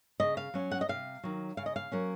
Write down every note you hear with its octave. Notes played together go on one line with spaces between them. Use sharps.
C#3 D#5
F5
F#3 C#4
F#5
D#5
C3 F5
D#3 F#3
C#3 F5
D#5
F5
F#3 A#3 C#4